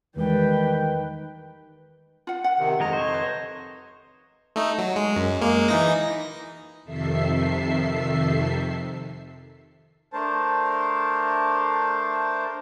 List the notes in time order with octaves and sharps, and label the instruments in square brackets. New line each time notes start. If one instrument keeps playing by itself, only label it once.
[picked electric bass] E2 E3 G#3 [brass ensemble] D#3 [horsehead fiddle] G3 G5 [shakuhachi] B4
[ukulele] F4 F#5
F#5
[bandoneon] C3 D#3
[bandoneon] F2 D#5 [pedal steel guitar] D#3 G#3 A#5
[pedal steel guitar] C5 C#5
[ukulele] B4
[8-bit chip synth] A3 D#4
F#3
G#3
F#2
G#3 A#3
E3 D#4 A#6
[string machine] F2 C3 D#3 A4 E5 C7
[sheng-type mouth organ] A3 D4 A#4 C5 A5